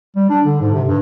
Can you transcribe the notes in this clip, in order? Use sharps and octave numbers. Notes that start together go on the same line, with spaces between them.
G3
D4
D3
G#2
C3
G2